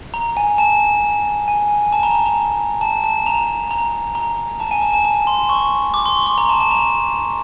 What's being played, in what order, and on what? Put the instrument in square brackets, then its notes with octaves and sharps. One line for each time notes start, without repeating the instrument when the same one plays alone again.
[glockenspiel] A#5
G#5
A5
G#5
A5
A#5
A5
A#5
A5
A5
A#5
A#5
A#5
A5
G#5
A5
A5
A5
C6
C#6
D6
C6
C#6
C6
A#5
A5
A5
A#5